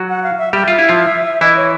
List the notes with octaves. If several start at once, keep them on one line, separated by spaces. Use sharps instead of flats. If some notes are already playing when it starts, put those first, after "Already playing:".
Already playing: F#3 F#4
F#5
F5
E5
G3 G4 E5
F4
E4
F3 F4
E3 E4 D#5
C#5